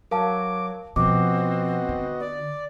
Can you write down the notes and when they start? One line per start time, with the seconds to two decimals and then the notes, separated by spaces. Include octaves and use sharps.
0.11 F#3 A#4 F5 A5 D6
0.96 B2 F3 B3 C4 F#4 D#5 D6
1.89 D3
2.20 D5